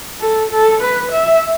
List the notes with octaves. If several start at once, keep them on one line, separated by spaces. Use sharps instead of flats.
A4
A4
B4
E5